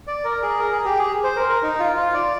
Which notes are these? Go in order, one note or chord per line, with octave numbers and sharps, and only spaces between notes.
D5
A#4
G#4
A#4
G#4
G4
G#4
C5
A#4
A#4
D#4
F4
F4
D5